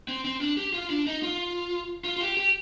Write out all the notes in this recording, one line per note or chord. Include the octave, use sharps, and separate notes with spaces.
C4
C4
D4
G4
F4
D4
D#4
F4
F4
F4
G4
G4